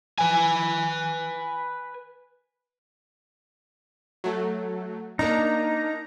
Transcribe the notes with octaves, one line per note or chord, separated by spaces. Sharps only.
B4 G#5
F#3 A3
A#3 D4 D#4 A#5